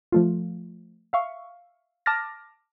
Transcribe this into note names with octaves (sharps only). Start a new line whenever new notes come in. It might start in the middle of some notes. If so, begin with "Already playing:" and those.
F3 A3 F4
E5 F5 C#6
A5 D6 F6 A6 A#6